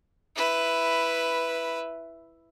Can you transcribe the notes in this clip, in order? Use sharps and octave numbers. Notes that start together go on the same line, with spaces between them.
E4 B4